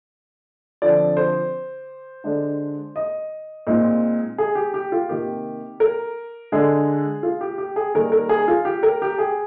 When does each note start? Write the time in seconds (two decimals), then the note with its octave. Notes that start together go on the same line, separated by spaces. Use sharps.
0.82 D3 F3 C4 D5
1.17 C5
2.24 D3 G#3 D4
2.96 D#5
3.67 A#2 G#3 C4 D#4
4.38 G#4
4.55 G4
4.74 G4
4.92 F4
5.09 C3 D#3 A#3 G4
5.80 A#4
6.52 D3 G#3 D4 G#4
7.23 F4
7.41 G4
7.58 G4
7.76 G#4
7.94 D#3 G3 A#3 A#4
8.12 A#4
8.29 G#4
8.48 F4
8.65 G4
8.83 A#4
9.02 G4
9.18 G#4